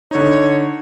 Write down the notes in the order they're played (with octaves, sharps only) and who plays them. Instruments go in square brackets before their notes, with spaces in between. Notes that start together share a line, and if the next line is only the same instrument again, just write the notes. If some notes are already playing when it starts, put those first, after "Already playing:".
[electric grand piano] D3 D#4 [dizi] C#5